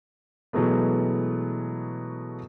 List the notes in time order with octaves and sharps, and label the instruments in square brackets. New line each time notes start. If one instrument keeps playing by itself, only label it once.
[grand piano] B2 E3 F#3 G#3 A3 B3